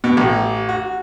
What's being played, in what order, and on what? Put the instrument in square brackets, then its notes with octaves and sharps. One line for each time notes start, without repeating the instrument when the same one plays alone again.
[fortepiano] B2
A1
F#4